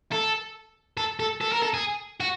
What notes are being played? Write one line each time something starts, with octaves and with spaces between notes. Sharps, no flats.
A4
A4
A4
A4
A#4
A4
G#4
F#4